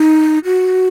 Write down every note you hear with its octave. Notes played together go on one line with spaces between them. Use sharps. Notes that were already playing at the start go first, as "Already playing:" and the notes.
Already playing: D#4
F#4